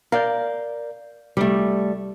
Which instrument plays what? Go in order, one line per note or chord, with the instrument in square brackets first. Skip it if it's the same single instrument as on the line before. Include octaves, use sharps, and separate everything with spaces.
[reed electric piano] A#4 D5 G6 [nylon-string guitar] F5
[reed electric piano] C2 D6 [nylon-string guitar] G3 A3